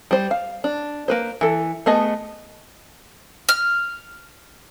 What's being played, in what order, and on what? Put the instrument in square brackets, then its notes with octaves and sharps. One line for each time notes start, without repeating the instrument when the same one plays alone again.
[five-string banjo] G3 C5
F5
D4
A#3 B4 C5
E3 A4
A3 B3 G#4 D#5 A5
[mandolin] F6